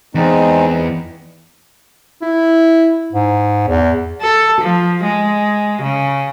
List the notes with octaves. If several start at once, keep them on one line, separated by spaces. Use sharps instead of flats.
E2 G#3 C4 D#4
E4
G#2
E2
A4
F3
G#3
C#3